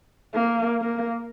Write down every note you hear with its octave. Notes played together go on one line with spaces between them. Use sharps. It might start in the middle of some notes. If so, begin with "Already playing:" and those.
A#3
A#3